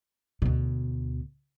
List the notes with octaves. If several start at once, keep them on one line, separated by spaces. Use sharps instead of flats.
D2 B2